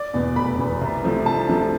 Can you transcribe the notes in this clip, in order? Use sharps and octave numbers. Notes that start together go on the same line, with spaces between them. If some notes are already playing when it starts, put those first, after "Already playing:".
Already playing: D5
E2 B2
F1 B5
E2 B2
C2
C3 F3 A3
C2 A5
C3 F3 A3